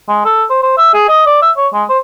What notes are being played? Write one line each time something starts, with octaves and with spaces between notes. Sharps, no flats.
G#3
A4
C5
C5
E5
G#4
D#5
D5
E5
C#5
G#3
C5